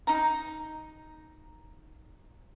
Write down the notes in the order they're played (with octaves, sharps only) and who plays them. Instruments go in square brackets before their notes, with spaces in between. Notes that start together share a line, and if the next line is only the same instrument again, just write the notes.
[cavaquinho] D#4 A#5